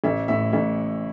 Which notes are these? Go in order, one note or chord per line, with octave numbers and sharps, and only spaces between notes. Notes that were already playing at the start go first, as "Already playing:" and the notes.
A1 E5
A2 E5
A1 E5